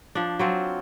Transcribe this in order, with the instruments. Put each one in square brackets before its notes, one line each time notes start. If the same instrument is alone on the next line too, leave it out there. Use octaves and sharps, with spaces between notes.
[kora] F3 D4
F#3 C4 F4